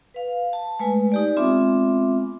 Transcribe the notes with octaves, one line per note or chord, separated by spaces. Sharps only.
B4 F5
A5
G#3 A3 B4 G#5
D#4 G4 D5
G#3 B3 C4 F4 E5 D6